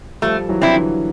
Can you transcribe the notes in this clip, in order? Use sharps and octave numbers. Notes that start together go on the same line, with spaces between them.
F3 G3 A3
E3 F#3
C4 E4
D3 E3